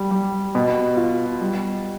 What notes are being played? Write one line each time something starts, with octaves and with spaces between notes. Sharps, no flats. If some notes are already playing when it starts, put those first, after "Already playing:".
Already playing: G3
G3
B2
F4
G3